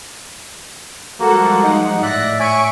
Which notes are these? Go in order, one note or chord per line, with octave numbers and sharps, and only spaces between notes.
F3 G3 G#3 A#3 F#4 A4 F#5
D#4 F#5
A2 D5 E5 F#6 A#6
C#5 E5 G#5 C#6 D7